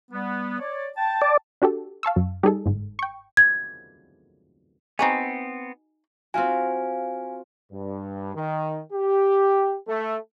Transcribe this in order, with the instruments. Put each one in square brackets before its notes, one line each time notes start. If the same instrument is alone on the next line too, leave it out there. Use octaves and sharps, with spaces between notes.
[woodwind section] G3 B3
C#5 D5
G5 A5
[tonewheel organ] D5
[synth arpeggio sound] D4 F#4 G4 A4
F5 A5 C#6 E6
F#2
G3 D#4 G#4 A4
G1 G#2
G5 C#6
[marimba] G#6
[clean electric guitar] B3 C4 [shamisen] D#4 F#4 G#4
[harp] C4 F4 F#4 [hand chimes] F5 G#5
[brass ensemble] G2
D#3
G4
A3